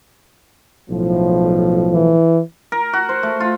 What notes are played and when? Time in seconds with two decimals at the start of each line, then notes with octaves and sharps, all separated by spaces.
0.90 B1 A2 F3
1.93 E3
2.72 A#4
2.93 F#4
3.09 C5
3.23 A3
3.40 F4